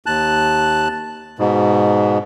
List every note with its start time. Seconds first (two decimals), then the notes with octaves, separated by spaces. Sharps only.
0.06 D#2 A5 F#6
1.39 G#2 B2